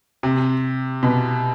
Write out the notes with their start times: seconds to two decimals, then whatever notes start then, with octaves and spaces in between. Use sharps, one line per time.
0.23 C3
1.03 B2